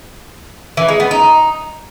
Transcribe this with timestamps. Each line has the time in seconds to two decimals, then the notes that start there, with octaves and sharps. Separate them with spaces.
0.77 E3
0.89 G#3
1.00 B3
1.11 D#4